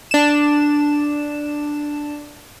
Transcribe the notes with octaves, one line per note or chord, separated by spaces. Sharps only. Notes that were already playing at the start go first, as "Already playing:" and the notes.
D4 E7